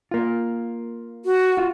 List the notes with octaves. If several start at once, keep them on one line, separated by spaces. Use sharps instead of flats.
A#3 F4
F#4
F4 F#4